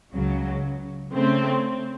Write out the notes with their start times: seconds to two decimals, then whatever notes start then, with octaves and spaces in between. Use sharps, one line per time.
0.13 C#2 C#3 F#3
1.13 C#3 A3 C4